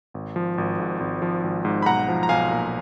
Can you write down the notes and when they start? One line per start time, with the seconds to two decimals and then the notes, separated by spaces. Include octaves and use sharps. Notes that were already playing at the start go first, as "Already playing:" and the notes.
0.14 G#1
0.36 F3
0.58 G#1
0.79 G#2
1.00 G#1
1.22 F3
1.43 G#1
1.65 G#2
1.83 B5
1.86 B1 F#5 A#5
2.08 F3
2.23 A#5
2.29 B1 F5 G#5
2.51 A#2